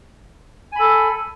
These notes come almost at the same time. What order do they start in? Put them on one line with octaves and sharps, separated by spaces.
G#5 B5 A4